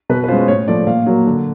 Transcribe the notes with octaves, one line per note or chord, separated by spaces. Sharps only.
B2 B4
B4
G#3 C#4 F4 C5
A2 C#5
F3 A3 D5
A#2 F5
F#3 A#3
D3